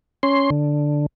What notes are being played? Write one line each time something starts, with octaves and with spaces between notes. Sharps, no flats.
C#4 C6
D3